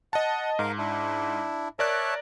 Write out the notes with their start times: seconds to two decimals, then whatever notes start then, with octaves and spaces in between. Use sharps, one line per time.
0.13 D#5 F#5 A5
0.59 G#2 A#4 F5
0.78 D4 E4
1.79 A#4 C#5 D5 E5 A5 F#6